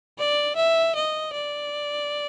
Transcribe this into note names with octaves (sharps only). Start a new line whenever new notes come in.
D5
E5
D#5
D5